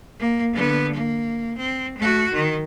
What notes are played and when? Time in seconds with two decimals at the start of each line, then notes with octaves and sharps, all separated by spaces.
0.19 A#3
0.53 D3 B3
0.93 A#3
1.58 C4
1.98 A3 F#4
2.33 D#3